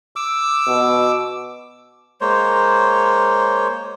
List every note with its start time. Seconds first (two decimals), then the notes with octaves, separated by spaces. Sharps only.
0.16 D6 E6
0.68 B2
2.21 G#3 A#3 C5 C#5